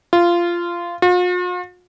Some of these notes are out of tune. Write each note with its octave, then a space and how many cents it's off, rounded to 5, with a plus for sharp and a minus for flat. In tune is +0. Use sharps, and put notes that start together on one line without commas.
F4 -15
F4 +45